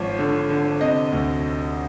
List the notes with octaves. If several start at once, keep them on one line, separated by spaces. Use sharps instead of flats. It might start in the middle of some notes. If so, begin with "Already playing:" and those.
Already playing: G#1 F3 C#5
D3
D3
C3 D#5
D2